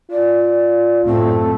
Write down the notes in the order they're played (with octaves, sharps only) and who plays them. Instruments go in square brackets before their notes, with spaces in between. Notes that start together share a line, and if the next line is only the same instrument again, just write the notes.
[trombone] F4 [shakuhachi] D5
[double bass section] F#2 A2 A3 [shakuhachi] C4